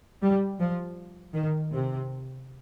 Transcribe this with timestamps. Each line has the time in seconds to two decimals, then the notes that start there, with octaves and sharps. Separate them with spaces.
0.23 G3
0.59 F3
1.34 D#3
1.72 C3